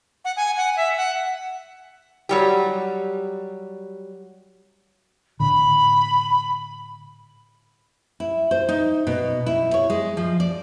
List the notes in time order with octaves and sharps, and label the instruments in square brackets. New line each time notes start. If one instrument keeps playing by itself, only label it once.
[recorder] F#5
G#5
F#5
E5
F#5
[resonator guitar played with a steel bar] F#3 G3 G4
[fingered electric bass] A2 D3 [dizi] B5
[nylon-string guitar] E4
C5
D#4
B2
E4
C#5
G#3
F3
D5